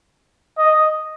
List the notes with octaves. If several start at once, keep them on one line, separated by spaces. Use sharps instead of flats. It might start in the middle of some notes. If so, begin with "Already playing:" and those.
D#5